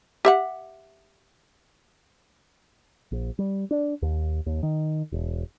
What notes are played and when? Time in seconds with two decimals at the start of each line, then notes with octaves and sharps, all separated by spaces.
0.25 G4 E5 F#5
3.12 A#1
3.39 G3
3.71 D4
4.02 D#2
4.46 D#2
4.63 D#3
5.12 E1